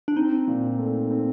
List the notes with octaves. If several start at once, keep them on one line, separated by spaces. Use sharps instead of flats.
D4
C4 D#4
A#2
A3
C4